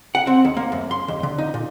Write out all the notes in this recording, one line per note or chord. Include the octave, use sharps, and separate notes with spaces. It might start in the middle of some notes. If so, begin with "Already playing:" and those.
F#5
C4
D#2
A#3
F#2
C6
D#2
D3
D#4
A#2